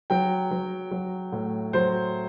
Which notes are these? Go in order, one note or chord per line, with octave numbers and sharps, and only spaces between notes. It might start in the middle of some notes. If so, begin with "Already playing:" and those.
F#3 G5
F#3
F#3
A2
F#3 C5